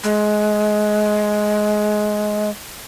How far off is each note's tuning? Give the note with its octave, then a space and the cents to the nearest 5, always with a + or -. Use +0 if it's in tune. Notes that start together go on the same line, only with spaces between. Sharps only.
G#3 +20